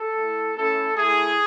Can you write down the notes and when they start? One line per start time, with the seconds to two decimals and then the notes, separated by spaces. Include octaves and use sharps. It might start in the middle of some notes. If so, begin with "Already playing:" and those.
Already playing: A4
0.15 A3 E4
0.56 A3 C#4 E4 A4
0.97 A3 E4 G#4